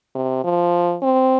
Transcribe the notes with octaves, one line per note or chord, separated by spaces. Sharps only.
C3
F3
C4